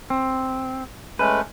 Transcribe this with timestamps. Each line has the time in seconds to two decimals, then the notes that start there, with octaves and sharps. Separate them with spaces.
0.10 C4
1.19 G#3 A3 C#4 B4